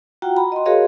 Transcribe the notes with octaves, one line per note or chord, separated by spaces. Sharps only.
F4 F#4 F#5 G5 A#5
A#5 B5
D#5 C6
F#4 G#4 A#4 C#5 D#5 F5